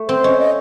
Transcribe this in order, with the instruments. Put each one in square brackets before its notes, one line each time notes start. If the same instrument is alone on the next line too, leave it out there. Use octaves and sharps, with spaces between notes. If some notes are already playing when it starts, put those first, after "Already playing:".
Already playing: [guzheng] A3
[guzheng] C4 [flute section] C5
[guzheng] C#4 [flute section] D#5
[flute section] D#5